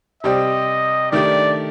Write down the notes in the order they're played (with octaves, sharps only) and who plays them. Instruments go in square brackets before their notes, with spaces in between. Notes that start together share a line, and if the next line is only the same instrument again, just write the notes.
[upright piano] C3 G3 C4 G4 D5 [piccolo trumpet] D#5
[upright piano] D#3 A3 D4 G4 [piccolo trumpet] D5